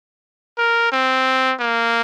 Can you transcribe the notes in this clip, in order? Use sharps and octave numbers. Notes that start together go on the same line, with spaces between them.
A#4
C4
A#3